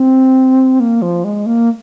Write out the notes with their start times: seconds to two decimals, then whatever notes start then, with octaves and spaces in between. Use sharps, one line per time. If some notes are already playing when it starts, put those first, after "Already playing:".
Already playing: C4
0.80 A#3
1.02 F3
1.24 G#3
1.46 A#3